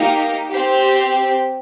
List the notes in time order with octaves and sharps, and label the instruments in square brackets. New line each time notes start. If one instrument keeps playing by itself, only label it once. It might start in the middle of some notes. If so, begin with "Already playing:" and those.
Already playing: [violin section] A#3 D#4 G4
C4 G4